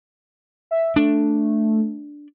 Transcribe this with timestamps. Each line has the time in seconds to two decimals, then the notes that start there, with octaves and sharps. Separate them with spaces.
0.71 E5
0.96 A3 D4